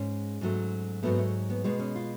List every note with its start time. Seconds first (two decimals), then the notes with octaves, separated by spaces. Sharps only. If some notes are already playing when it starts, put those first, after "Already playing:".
Already playing: G#2 G#3 C#4
0.41 G#2 F#3 A3
1.03 G#2 F#3 A3 B3
1.19 A3
1.50 B3
1.64 B2 G#3 B3
1.80 C#4
1.95 F4